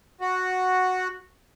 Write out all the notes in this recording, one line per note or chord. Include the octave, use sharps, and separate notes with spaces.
F#4